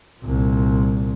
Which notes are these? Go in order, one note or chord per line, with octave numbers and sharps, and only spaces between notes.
C2 A#2